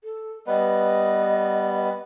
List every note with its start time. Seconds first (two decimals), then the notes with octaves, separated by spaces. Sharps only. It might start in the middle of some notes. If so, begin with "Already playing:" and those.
0.04 A4
0.47 G3 B3 B4 D#5